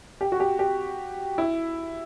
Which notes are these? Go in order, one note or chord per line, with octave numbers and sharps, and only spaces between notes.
G4
F#4
G4
G4
E4